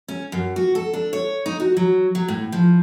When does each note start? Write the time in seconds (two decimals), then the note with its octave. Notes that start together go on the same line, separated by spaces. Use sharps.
0.08 C#4
0.32 F#2
0.56 F#4
0.75 A4
0.93 D4
1.13 C#5
1.46 D#4
1.60 F#4
1.77 F#3
2.15 F#3
2.28 A2
2.52 F3